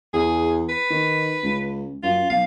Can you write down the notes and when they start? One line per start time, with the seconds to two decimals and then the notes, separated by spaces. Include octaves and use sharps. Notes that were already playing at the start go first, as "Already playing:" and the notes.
0.14 E2 G#4
0.69 B4
0.90 D#3
1.43 C#2
2.03 F#2 F4
2.30 B1 F5